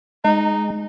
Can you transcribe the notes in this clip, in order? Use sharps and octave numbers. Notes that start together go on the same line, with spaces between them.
G#3 D#4